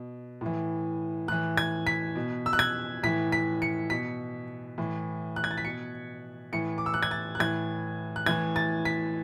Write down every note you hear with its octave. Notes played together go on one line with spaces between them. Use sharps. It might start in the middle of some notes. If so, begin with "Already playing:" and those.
Already playing: B2
A2 E3
A2 E3 F#6
G#6
B6
B2
E6
F#6
G#6
A2 E3 B6
B6
C#7
B2 B6
A2 E3
F#6
G#6
A6
B6
B2 C#7
A2 E3 C#7
D6
E6
F#6
G#6
A6
F#6
A2 E3 G#6
F#6
A2 E3 G#6
A6
B6